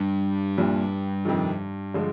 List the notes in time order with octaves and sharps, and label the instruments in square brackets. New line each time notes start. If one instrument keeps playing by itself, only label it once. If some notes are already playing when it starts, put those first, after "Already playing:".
Already playing: [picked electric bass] G2
[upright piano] C2 A#2 G3
F2 C3 D#3
D3 F3 G#3